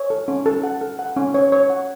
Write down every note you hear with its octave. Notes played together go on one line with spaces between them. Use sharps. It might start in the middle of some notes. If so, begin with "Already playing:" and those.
Already playing: C#5
A4
C#4
A4
F#5
A4
F#5
C#4
C#5
C#5
F#5